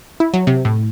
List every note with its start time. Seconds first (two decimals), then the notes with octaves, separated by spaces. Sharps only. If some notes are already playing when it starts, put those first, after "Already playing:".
0.20 E4
0.34 F#3
0.47 C3
0.65 A2